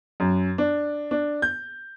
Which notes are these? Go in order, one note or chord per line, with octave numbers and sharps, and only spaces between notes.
F#2
D4
D4
G6